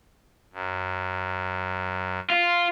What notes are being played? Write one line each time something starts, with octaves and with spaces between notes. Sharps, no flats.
F#2
F4